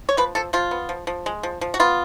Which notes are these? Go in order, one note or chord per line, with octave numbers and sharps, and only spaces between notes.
C#5
F3 B4
F3 A4
F3 F4
B3
F3
F3
G#3
F3
F3
F#4
B3 F4